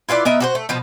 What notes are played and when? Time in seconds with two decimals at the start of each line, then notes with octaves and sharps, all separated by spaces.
0.09 E4 F4 B4 D5
0.25 B3 A#4 D#5 E5
0.40 F#4 G4 C5
0.55 A3
0.69 B2 F3 B3